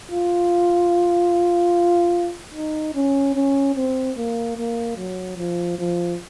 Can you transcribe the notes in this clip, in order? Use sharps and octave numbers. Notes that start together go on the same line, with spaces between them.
F4
D#4
C#4
C#4
C4
A#3
A#3
F#3
F3
F3